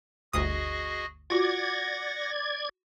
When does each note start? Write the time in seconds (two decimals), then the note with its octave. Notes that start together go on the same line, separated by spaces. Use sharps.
0.33 G1 D2 F#4 G#4 D#5 D#6
1.30 F4 F#4 D5 F#5 G#6 A#6